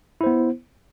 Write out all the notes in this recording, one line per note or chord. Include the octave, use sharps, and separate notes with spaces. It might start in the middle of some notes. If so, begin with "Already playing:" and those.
B3 E4 C5